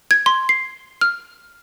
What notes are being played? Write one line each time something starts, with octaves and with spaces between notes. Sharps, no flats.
G#6
C6
C7
F6